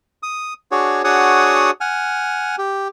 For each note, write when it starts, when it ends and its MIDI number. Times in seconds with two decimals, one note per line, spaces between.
0.23 0.53 87
0.72 1.02 62
0.72 1.02 66
0.72 1.02 68
0.72 1.02 73
1.04 1.71 62
1.04 1.71 66
1.04 1.71 68
1.04 1.71 73
1.04 1.71 78
1.04 1.71 87
1.81 2.56 78
1.81 2.56 80
1.81 2.56 89
2.58 2.88 67